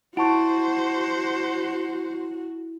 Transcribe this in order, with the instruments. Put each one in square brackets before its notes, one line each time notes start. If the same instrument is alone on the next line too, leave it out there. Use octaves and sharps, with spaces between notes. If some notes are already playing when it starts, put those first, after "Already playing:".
[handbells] E4 [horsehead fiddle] F#4 [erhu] C5 [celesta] F#5 A5 C#6